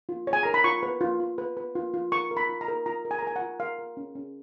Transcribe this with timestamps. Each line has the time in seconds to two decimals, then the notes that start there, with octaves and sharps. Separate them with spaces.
0.09 F4
0.27 C#5
0.33 G#5
0.43 A#4 A#5
0.54 B5
0.64 F4 C#6
0.83 B4
1.01 F4
1.20 F4
1.38 B4
1.57 B4
1.75 F4
1.94 F4
2.12 A#4 C#6
2.31 A#4
2.37 B5
2.49 F4
2.61 A#5
2.68 A#4
2.86 F4 A#5
3.05 A#4
3.11 G#5
3.19 A#5
3.23 A#4 G#5
3.36 F#5
3.41 F4
3.60 A#4 F5
3.79 A#4
3.97 C#4
4.15 C#4